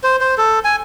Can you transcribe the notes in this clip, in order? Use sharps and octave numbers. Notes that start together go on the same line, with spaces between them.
C5
C5
A4
G#5